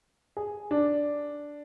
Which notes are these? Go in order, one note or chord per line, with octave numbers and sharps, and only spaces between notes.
G#4
D4